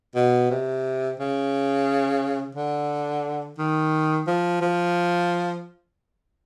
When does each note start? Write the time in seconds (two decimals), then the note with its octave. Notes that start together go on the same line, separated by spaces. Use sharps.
0.15 B2
0.50 C3
1.19 C#3
2.55 D3
3.58 D#3
4.27 F3
4.62 F3